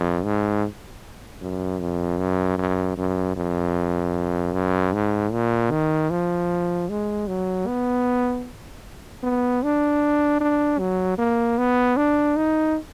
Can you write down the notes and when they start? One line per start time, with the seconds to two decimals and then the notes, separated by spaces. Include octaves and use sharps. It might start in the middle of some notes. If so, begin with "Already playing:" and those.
Already playing: F2
0.24 G#2
1.41 F#2
1.80 F2
2.19 F#2
2.58 F#2
2.97 F#2
3.37 F2
4.53 F#2
4.93 G#2
5.32 A#2
5.71 D#3
6.10 F3
6.89 G#3
7.28 F#3
7.67 B3
9.23 B3
9.63 D4
10.40 D4
10.79 F#3
11.18 A#3
11.58 B3
11.97 D4
12.36 D#4